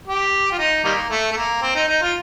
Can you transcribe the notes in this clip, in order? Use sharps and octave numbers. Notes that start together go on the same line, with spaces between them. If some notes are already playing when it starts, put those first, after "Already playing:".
G4
F4
D#4
D#3 G3 A#3
A3
A3
A#3
C4
D#4
D#4
F4